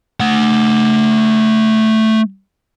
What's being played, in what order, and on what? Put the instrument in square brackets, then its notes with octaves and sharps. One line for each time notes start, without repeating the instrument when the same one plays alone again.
[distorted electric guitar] A3 F#5